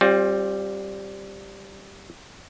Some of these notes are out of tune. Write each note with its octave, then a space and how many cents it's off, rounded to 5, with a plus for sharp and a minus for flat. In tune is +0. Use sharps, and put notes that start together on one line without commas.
G3 +0 C4 +30 F4 +25